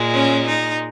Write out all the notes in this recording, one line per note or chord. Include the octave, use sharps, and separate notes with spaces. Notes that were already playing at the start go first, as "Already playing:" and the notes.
Already playing: A#2 G#3
C#4
D#4